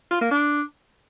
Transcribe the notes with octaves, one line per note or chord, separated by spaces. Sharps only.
F4
A#3
D4